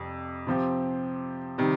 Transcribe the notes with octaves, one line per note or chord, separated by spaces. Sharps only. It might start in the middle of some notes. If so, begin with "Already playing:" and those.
Already playing: F2 C3 G3
C3 F3 C4 G4
C3 D#3 G3